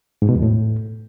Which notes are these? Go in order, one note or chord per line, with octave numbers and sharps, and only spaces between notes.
G#2
B2
E2
A2